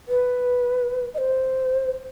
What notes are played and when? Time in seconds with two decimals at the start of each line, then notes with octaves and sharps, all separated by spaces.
0.08 B4
1.14 D#5
1.18 C5